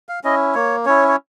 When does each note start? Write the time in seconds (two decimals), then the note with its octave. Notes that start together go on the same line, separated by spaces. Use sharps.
0.09 F5
0.24 C#4 E4 D#5
0.55 A#3 C#5
0.86 C#4 E4 C#5
1.08 C#5